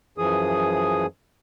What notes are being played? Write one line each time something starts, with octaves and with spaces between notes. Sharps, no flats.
F#2 E3 F3 G#4 D#6